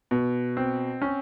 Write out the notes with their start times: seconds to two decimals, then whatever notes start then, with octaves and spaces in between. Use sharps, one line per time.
0.11 B2
0.57 C4
1.02 C#4